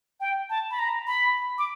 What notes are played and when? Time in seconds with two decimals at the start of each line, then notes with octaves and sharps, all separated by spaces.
0.20 G5
0.50 A5
0.71 B5
0.79 A#5
1.07 B5
1.58 D6